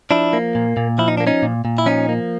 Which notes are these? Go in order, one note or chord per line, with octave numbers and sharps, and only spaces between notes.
F3 D4 E4
A#3
A#2
A#2
F3 E4
D#4
A#3 D4
C#4 D#4
A#2
A#2
E4
F3 C#4 D#4
A#3